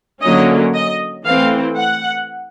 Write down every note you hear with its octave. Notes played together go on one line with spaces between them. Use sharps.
D3 F#3 A#3 C#4 D#5
D#5
E3 A3 C4 F5
F#5